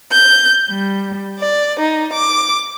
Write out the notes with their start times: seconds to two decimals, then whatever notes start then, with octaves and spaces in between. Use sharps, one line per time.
0.11 G6
0.69 G3
1.39 D5
1.80 D#4
2.12 D6